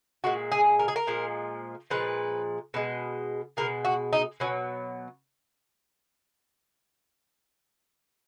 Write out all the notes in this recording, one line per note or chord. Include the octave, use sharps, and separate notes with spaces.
A#2 G#3 F#4
G#4
A#4
G#4
A#4
A#2 F3 G#3
A#2 F3 G#3 B4
B2 G#3
B2 G#3 A#4
F#4
D#4
B2 F#3 C#4